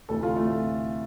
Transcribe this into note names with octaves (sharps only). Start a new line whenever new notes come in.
D2 C3 E3 A4
F4
A3